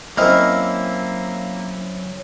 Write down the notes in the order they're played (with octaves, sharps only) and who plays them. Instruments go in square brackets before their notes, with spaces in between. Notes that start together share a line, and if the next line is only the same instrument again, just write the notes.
[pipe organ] F#3 [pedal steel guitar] A#3 F6 [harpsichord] C4 C#4 E4 [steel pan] A#4 D#5